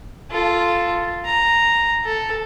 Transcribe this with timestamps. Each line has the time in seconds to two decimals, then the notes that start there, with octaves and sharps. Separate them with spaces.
0.31 F4 A4
1.26 A#5
2.04 A4